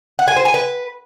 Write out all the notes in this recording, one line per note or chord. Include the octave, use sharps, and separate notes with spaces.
F#5
G#5
C5
G#5
B4